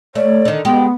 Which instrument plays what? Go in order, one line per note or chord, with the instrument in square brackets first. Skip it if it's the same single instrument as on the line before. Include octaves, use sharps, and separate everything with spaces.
[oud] A3 [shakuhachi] C#5 [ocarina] D5
[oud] D3 D#3
[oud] G#3 G4 [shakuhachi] B3 [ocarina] G5